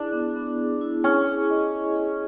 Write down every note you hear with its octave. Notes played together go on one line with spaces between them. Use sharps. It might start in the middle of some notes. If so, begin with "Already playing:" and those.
Already playing: D4 E4 G#4
B3
B3
G#4
E4
C#4 G#4
G#4
D#5
G#4
G#4